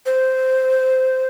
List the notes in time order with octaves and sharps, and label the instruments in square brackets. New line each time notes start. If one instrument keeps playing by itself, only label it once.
[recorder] C5